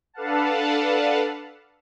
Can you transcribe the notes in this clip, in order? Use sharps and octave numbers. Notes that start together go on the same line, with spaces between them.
D4 A4 B4 F5 F#5 A5